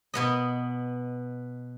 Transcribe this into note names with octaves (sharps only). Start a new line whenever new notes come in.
B2 B3 D#5